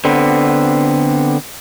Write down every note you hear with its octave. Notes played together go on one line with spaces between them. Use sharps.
D3 B3 C4